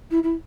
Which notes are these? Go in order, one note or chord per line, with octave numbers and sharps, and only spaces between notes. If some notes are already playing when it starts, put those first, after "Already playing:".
E4
E4